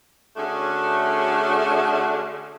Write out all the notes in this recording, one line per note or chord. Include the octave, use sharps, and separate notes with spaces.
D3 A3 C#4 D4 F#4 G#4